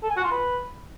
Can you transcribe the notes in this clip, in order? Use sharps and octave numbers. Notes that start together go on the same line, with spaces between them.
A4
G#5
F#4
F4
B4